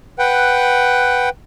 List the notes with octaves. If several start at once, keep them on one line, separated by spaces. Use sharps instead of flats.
B4 F#5 G5